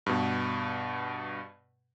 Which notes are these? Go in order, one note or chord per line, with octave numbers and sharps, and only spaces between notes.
G2 B2